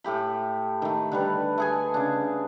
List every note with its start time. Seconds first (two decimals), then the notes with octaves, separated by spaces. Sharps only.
0.04 A2 A3 G4 B5
0.82 D#3 A3
1.12 D3 G3 B4
1.58 A3 G#4 G#5
1.94 C#3 D4